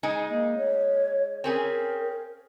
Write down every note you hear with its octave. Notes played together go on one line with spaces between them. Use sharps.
G#3 D#4 G#4
A#3
C#5
C4 C#4 G#4 A#4